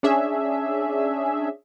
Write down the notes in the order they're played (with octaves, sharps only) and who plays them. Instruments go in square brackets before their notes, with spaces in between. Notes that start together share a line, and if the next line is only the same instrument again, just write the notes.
[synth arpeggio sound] C#4 D4 G#4 E5